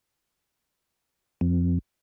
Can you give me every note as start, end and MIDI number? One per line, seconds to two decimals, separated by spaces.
1.41 1.79 41